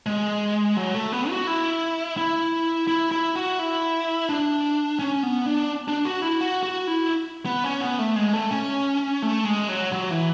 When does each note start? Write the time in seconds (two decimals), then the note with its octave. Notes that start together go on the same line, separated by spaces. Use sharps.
0.06 G#3
0.76 F#3
0.94 A3
1.12 B3
1.29 F#4
1.47 E4
2.17 E4
2.87 E4
3.12 E4
3.35 F#4
3.59 E4
4.29 D4
4.99 C#4
5.23 B3
5.46 D4
5.88 D4
6.05 F#4
6.22 E4
6.41 F#4
6.63 F#4
6.87 E4
7.46 B3
7.64 C#4
7.81 B3
7.99 A3
8.16 G#3
8.33 A3
8.51 C#4
9.22 A3
9.45 G#3
9.69 F#3
9.92 F#3
10.10 E3